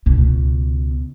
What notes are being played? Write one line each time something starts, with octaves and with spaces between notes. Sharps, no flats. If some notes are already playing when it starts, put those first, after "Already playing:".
C#2 B2